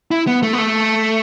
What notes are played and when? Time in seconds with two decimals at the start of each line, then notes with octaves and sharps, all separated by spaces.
0.11 E4
0.27 B3
0.43 A3
0.53 B3
0.58 A3